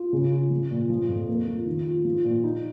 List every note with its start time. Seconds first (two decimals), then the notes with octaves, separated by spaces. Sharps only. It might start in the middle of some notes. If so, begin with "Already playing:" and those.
Already playing: F4
0.13 C#3
0.31 F4
0.50 F3
0.71 A#2
0.89 F3
1.09 F2
1.28 A#3
1.47 F3
1.66 D#3
1.86 F4
2.05 F3
2.24 A#2
2.44 D#4